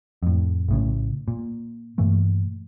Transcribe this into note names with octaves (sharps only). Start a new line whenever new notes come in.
F2 A2
A#1 A2 C#3
A#2
G2 A#2 E3 A3